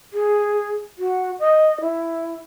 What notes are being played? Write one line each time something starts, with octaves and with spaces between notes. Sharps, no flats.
G#4
F#4
D#5
E4